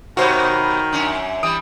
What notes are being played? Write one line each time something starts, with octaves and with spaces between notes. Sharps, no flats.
B2 D#3 B3 F#4 C5 C#5
F#2 C#4 D4
E3 G3 D#6 D7